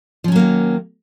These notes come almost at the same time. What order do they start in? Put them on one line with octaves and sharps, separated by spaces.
F3 C#4 F#3 A#3 D#3